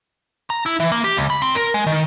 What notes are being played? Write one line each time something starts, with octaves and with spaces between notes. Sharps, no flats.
A#5
E4
E3
A#3
G4
C#2
B5
C4
A#4
G#3
D#3